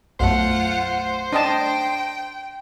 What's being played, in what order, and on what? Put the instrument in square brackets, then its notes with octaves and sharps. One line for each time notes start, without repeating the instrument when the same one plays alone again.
[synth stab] B1 F#2 A3 [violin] F4 F#5 [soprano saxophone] C5
[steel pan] D4 D#5 A5 [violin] G5